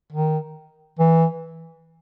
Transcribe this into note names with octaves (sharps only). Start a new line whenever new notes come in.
D#3
E3